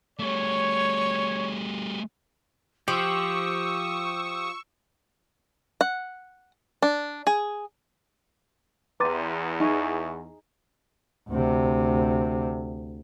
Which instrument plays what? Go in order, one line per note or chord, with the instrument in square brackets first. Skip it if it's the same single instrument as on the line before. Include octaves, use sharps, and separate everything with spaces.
[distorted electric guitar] G3 A3 [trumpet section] C#5
[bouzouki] F3 [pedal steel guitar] G4 [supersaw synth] C#6 E6 [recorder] D#6
[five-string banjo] F#5
D4
G#4
[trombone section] E2 [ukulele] G4 [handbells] B4 D6 A6 [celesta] A#5 C6 D#7
[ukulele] D#4 G#4 [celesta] E5 G#5 C#6
[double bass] D2 C3